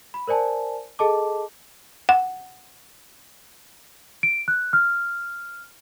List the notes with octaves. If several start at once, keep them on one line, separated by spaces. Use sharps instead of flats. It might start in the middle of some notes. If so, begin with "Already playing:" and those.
B5
A#4 C5 D5 G#5 A5
G#4 A4 D#5 A5 D6
F#5
D7
F#6
F6